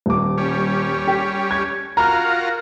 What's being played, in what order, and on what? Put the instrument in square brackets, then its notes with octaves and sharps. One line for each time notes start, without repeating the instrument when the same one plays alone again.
[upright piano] D#1 D6
[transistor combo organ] G3 C#4
[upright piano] G4
G#6
[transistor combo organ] F4 F#4 A#4 [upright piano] A#5 F6